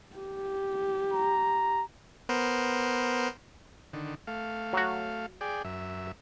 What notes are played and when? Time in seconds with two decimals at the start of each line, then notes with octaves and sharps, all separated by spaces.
0.16 G4
1.14 A#5
2.29 B3 A#4 C5
3.93 D3 D#3
4.27 A3 F5
4.73 F#3 F#4
5.41 G#4 D5 G5
5.65 F#2 E5